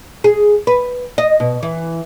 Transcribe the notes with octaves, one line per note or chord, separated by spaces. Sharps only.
G#4
B4
D#5
B2
E3